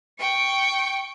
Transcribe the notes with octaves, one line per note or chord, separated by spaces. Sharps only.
G5 C#6